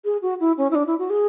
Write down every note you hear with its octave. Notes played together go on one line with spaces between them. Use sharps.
G#4
F#4
E4
C#4
E4
D4
E4
F#4
G#4